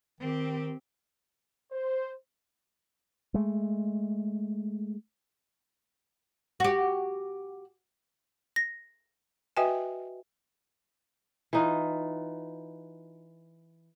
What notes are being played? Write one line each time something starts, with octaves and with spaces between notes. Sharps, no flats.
D#3 C4 G4
C5
G#3 A3
F#4 G4
A#6
F#4 B4 D#5 E5 G5 G#5
E3 D#4 F4